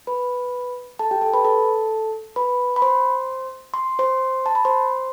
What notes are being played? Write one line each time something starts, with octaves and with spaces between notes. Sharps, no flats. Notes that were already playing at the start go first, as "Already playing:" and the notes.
B4 B5
A4 A5
G4 G5
A4 A5
B4 B5
A4 A5
B4 B5
B5
C5 C6
C6
C5 C6
A5
B5
C5 C6